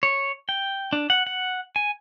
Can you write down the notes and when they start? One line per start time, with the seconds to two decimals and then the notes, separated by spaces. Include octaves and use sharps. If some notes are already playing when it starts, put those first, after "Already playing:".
0.03 C#5
0.49 G5
0.93 D4
1.10 F#5
1.27 F#5
1.76 G#5